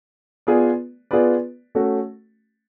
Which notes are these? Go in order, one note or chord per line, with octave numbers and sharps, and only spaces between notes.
B3 F4 G#4 B4 D5
B3 F4 G#4 B4 D5
A3 C#4 F#4